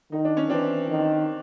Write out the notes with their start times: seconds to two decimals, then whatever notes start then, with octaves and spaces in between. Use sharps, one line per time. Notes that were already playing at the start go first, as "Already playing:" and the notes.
0.12 D#3 D#4
0.25 D4
0.37 C#4
0.50 E3 C4 D4
0.90 D#3